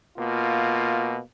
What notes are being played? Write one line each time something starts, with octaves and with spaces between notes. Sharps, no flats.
B2 A#3 F4